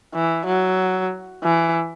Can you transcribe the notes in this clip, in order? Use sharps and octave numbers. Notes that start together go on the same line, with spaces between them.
E3
F#3
E3